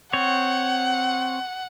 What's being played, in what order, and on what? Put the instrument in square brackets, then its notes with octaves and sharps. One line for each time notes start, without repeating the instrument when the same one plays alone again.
[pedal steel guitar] C4 C#5 [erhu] F#5